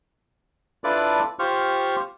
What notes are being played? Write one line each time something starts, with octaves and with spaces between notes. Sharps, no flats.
D4 E4 F4 A4 B4 D5
F4 G4 C5 C#6 F6